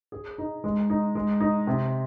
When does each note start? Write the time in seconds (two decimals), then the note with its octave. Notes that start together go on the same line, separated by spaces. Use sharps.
0.12 G#4
0.38 D#4
0.64 G#3
0.90 D#4
1.15 G#3
1.40 D#4
1.67 C3